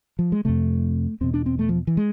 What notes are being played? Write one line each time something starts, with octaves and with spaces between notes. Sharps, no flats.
F3
G#3
F2 C3 A3
E2 B2 C4
D4
C4
A3
F3
E3
G#3